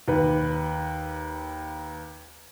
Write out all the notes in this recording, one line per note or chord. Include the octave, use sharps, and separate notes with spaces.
D#2 B4